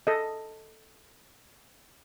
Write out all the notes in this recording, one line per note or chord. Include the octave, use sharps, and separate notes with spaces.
A4 D#5